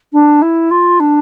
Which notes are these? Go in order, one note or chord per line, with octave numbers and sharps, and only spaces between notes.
D4
E4
F4
D4